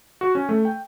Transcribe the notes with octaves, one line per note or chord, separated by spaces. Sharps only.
F#4
C#4
A3
G5